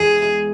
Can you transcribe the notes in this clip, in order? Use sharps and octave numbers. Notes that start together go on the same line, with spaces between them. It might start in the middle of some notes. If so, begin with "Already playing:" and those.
Already playing: E2 E3 G#3 G#4